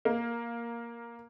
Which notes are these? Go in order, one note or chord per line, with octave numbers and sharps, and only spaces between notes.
A#3